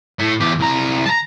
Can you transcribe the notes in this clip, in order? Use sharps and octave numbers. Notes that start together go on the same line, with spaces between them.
A2
E2 G4
C2 A#5
A5 A#5